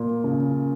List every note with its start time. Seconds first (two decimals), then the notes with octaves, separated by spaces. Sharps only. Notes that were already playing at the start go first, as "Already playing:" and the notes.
Already playing: A#2
0.24 C#3